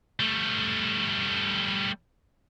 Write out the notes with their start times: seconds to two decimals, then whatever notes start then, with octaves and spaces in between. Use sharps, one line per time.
0.20 G3 A3